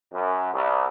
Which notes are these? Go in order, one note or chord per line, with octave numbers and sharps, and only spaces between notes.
F#2
C2